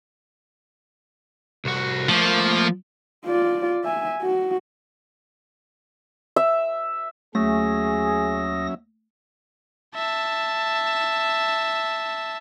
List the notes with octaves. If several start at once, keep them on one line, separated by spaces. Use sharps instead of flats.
C2 F#4
F3 A3 A#3
F4 D5
E5 G#5
F#4
E5
D#2 F#3 A3 C#4 G#4 E5 D#6 A#6
E5 A5